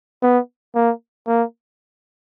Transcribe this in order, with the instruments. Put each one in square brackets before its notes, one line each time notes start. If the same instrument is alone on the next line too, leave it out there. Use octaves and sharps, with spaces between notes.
[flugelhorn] B3
A#3
A#3